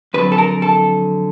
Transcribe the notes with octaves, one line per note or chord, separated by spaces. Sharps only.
F2 D3 F#3 B4
A4
A#4
A4